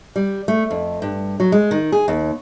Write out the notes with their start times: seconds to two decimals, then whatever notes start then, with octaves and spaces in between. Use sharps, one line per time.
0.16 G3
0.48 A3
0.71 F2
1.02 G2
1.40 F#3
1.52 G#3
1.71 D#3
1.92 G#4
2.08 D#2